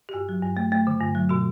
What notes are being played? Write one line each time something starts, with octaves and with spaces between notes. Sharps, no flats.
G4
G2 F#4
F#3
G2
A3
A3
D3
G2
F#3
B2 F#4